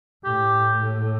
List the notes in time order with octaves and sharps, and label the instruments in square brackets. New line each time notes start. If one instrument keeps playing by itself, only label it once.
[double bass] A2 [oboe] G4